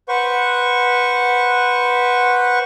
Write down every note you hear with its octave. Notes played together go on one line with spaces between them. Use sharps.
B4 C5 F#5 C#6